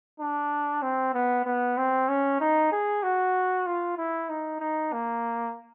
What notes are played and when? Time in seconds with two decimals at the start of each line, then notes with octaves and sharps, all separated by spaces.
0.20 D4
0.82 C4
1.14 B3
1.45 B3
1.77 C4
2.08 C#4
2.40 D#4
2.72 G#4
3.03 F#4
3.66 F4
3.98 E4
4.29 D#4
4.60 D#4
4.93 A#3